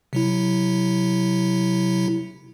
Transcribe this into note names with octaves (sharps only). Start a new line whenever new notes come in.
C3 F#3 E4